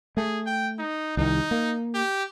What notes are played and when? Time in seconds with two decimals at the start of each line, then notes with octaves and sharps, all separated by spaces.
0.17 A3 G#4
0.46 G5
0.78 D#4
1.17 C2 D#3 D#4
1.51 A#3
1.94 G4